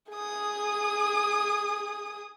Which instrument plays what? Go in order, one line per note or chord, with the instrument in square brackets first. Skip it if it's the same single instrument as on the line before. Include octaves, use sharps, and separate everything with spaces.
[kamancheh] G#4 D#6